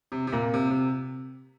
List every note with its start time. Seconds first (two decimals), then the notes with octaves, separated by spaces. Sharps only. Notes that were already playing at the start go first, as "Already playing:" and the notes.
0.12 C3
0.27 C3
0.32 A#2
0.54 C3
0.70 C3